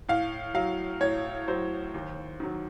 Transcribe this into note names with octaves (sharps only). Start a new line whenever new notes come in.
A2 F5
F#3 F5
A2 C#5
F#3 C5
D#2
D#3 F#3